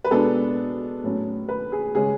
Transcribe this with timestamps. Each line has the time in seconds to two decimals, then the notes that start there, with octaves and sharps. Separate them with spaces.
0.04 B4
0.11 B2 G#3 B3 D4 A4
1.04 A2 F#3 C#4
1.49 B4
1.72 G#4
1.95 C#3 G#3 C#4 G#4